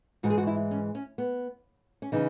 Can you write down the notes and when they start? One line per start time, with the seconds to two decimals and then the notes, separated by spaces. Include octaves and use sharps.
0.23 G#2 E3 G#3 F#4
0.30 G#4
0.38 F#4
0.47 E4
0.71 C#4
0.95 C#4
1.18 B3
2.02 C#4
2.12 C#3 E3 D#4